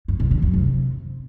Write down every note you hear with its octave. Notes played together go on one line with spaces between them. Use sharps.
G2
B2
D3
F#2
C3